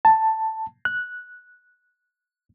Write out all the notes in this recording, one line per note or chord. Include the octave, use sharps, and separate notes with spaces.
A5
F#6